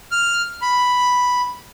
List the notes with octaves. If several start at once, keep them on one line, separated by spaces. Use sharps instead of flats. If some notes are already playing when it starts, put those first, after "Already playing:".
F6
B5